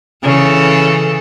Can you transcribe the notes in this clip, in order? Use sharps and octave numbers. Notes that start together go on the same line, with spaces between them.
C#3 E3 A4